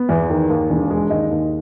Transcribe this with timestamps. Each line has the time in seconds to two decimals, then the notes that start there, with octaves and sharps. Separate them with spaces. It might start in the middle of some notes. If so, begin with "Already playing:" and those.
Already playing: B3
0.09 E2
0.30 D#3
0.49 D#2
0.70 E1
0.90 G#3
1.10 D#2 D#5
1.31 D#2